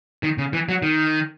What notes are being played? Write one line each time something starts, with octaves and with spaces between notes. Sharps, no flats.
D#3
C#3
E3
F#3
D#3